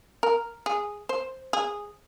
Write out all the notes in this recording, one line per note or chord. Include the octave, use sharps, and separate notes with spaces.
A#4
G#4
C5
G#4